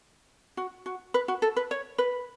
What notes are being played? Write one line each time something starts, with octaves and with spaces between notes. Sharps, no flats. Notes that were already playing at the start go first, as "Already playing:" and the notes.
F#4
F#4
B4
F#4
A4
B4
C#5
B4